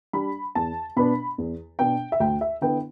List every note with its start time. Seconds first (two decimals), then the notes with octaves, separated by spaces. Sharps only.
0.13 G3 D4 B5
0.55 E2 A5
0.96 B2 B3 D4 B5
1.38 E2
1.79 B2 B3 D4 G5
2.12 E5
2.20 D2 G5
2.41 E5
2.61 D3 B3 E4 G5